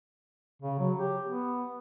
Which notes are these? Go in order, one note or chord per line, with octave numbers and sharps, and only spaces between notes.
C#3
F#3
G4
B3